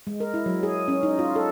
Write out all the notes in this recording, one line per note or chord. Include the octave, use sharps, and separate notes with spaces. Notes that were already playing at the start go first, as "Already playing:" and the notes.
G#3
A#4
E4
F#3
G#4
C#4
D#4
F4
A4